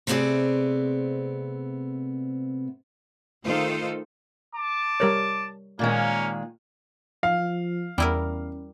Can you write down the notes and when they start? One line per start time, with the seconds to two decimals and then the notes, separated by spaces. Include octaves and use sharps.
0.07 C3 A3 B3 C4 G#4 D5
3.44 D#3 A3 D#4 F4 A4 C5
4.54 A5 D6
5.00 G3 A#4 C#5
5.79 A#2 D#3 G#3 A#3 C#4
7.23 F3 F5
7.98 E2 G3 C#4 E4 A#4